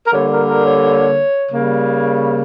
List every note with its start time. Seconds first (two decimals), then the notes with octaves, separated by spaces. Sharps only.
0.06 A#4
0.13 D3 G3 A#3 C#5
0.30 A#4
0.48 A#4
0.64 C#5
1.50 C#3 G3 A#3